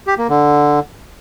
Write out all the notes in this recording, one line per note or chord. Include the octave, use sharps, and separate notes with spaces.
G4
A#3
D3